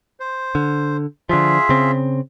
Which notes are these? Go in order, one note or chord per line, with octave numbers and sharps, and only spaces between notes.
C5
D3
D3 F3 F4 G#4 E5
C#3 C4